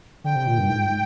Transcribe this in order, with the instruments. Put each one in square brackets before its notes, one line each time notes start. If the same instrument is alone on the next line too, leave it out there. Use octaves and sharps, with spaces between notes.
[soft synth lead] D3 [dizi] G5
[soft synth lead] C3
A#2
G2
G#2